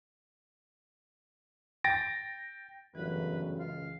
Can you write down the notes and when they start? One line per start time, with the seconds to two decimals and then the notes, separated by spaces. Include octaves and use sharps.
1.84 G5 A6 A#6 D7
2.95 G1 F#2 A2 C#3 E3 B4
3.60 C#2 F5